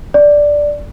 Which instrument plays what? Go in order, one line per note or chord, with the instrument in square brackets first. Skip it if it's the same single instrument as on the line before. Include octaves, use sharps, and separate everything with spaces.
[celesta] D5